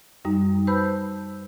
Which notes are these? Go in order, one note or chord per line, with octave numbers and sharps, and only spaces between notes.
F#2 G3 D#4
B4 C5 A5 B5 E6 G6